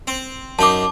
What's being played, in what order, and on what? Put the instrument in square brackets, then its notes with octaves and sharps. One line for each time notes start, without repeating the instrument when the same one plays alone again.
[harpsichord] C4
[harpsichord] F#2 D#4 [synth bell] A5 D6